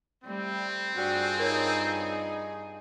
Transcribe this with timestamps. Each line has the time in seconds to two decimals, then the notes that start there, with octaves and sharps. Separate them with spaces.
0.23 G3 A3 C4
0.96 G2 G3 D4 F4 F#4 G#4
1.39 D#4 A#4 C#5